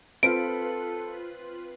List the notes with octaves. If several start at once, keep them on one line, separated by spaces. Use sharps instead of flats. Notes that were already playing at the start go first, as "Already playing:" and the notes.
C4 F4 A4 B4 D7